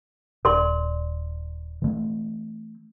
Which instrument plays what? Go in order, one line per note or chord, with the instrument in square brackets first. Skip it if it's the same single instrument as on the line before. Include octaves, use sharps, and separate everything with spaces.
[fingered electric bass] D#1 [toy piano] A#4 D5 C6
[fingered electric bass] E3 A3 C4